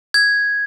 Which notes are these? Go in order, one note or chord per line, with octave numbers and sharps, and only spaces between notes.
G#6